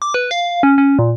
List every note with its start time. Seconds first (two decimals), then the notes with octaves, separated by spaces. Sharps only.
0.02 D6
0.14 B4
0.31 F5
0.63 C#4
0.78 C#4
0.99 A#2